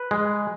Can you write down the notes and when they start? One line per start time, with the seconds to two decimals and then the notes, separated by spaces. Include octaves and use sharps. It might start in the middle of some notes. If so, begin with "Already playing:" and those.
Already playing: B4
0.11 G#3